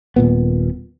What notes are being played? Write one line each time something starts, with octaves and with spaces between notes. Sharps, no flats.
D#1 A#2 B3